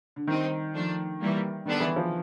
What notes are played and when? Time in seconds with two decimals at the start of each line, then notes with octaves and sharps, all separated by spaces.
0.16 D3
0.27 D#3 G3 C4 D#4
0.74 F3 A3 D4
1.20 E3 G3 A#3
1.65 D3 D#3 G3 B3 D4
1.80 E3
1.96 F3